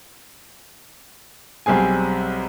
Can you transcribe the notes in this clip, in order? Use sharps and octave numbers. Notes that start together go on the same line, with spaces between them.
B1 G3 C4 G#4 G#5